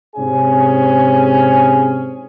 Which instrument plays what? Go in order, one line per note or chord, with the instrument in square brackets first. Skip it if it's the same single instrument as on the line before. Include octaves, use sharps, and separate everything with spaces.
[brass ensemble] G#2 C3 C#4 G#4 C5 G#5